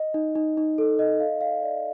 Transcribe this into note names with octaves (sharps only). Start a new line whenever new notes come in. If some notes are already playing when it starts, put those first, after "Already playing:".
Already playing: D#5
D#4
D#4
D#4
A4
D#5
F5
F5
D5